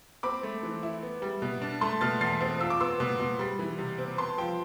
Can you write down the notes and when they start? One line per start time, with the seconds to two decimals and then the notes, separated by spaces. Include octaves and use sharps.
0.23 C4 B5 D6
0.43 A3
0.63 E3
0.83 E4
1.03 B3
1.22 G3
1.42 B2
1.62 D4
1.81 A3 A5 C6
2.01 B2 F6 A6
2.21 E2 A6 C7
2.41 C4
2.60 F4 E6
2.70 D6
2.80 B3 C6 E6
3.00 B2
3.20 B2
3.39 G3
3.59 E3
3.78 C3
3.98 C4
4.18 B3 A5 C6
4.38 F3 G5